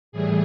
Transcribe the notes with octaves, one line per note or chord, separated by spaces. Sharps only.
A2 E3 G3 G#4